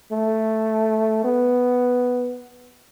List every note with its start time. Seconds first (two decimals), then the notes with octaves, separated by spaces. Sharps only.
0.12 A3
1.24 B3